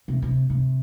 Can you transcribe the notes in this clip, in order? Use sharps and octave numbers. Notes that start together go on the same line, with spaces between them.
C3
C3
C3